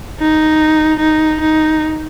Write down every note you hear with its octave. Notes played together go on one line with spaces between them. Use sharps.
D#4
D#4
D#4